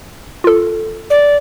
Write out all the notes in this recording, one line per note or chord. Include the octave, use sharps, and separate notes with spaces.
F4 A4
D5